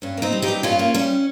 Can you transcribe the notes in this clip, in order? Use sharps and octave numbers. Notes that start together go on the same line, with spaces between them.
G2 C#4
A#3
C4 D#4
G3
D#4 G4
G2
G2 C#4 F4
A#3
G3 C#4